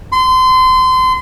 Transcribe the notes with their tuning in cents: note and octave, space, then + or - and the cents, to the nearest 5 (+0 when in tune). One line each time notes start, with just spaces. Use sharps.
C6 -30